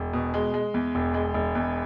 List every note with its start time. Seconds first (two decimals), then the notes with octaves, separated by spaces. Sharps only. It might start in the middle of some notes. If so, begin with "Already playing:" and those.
Already playing: E1
0.13 B2
0.34 G#3
0.54 G#3
0.74 E2
0.95 E1
1.14 G#3
1.34 E1
1.55 E2